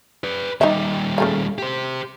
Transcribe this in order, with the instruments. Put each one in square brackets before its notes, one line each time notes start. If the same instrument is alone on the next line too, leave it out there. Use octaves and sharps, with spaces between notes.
[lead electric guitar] B4 D5
[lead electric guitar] D#2 G3 [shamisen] D#4 E5
[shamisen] C#3 A3 F5
[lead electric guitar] G4 C5